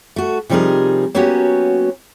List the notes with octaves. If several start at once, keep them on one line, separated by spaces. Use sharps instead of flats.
A3 F#4
C3 F3 G3 D#4 G#4 A#4
F#3 A#3 B3 C#4 F#4 G4